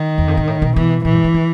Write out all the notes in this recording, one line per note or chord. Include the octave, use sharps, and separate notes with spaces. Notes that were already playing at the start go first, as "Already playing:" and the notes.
Already playing: D#3
E2
F2
G#2
A2
B2
B2 E3
A#2 E3
G2
C#3
D#3